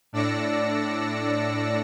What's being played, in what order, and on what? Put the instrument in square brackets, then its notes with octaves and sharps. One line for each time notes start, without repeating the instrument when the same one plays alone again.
[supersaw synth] A2 D4 D5 E6 A#6 C#7